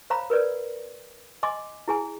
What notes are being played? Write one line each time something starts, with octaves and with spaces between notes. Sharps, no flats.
C5 C#5 F5 A#5 B5
A#4 B4 C#5 D5
D#5 G#5 C6 D6
E4 G#4 G#5